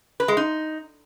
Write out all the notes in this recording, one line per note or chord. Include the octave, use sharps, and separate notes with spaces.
B4
G#3
D#4